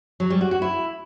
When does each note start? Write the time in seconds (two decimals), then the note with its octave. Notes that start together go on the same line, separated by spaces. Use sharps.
0.20 F#3
0.30 G3
0.41 F#4
0.51 F#4
0.62 E4